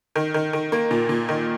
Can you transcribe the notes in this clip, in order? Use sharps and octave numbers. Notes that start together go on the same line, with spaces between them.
D#3
D#3
D#3
A#3
A#2
A#2
D#3